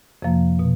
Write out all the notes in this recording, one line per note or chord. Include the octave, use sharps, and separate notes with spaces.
F2 C3 F3 A#3
B2